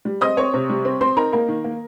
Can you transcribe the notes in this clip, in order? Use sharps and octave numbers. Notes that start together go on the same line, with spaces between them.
G3
C4 D#5 D#6
C4 C#5 C#6
C3
G3
C4
C4 C5 C6
D#4 A#4 A#5
A#3 A#4 A#5
D#3
A#3